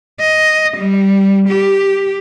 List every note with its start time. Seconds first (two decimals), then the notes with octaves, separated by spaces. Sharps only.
0.21 D#5
0.77 G3
1.48 G4